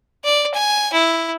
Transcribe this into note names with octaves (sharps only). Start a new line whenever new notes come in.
D5
G#5
E4